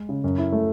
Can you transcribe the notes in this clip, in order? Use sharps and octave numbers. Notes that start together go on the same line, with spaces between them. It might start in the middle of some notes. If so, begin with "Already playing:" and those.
Already playing: G#3
C#3
F#2
E4
A3